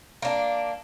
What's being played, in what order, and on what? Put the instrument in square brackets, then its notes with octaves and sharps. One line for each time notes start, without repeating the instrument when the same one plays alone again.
[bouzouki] A#3 D4